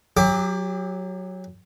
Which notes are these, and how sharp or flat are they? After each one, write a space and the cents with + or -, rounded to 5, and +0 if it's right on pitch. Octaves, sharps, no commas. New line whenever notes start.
F#3 +0 G4 +30 D6 +0